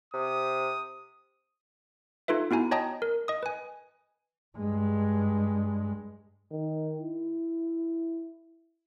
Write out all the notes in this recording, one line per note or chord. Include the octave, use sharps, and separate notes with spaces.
C3 D#6
D#4 F4 A4 B4 E5
B3 E4 F#4 G#5 A#5
C#5 D#5 G5 A5 A#5 D#6
A#4
D#5 D#6
B4 G#5
G2 G#3
D#3
E4